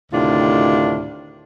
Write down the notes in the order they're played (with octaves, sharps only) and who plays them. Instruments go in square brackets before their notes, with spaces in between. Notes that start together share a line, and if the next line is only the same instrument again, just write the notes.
[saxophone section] D2 A2 C3 D#3 D4 F4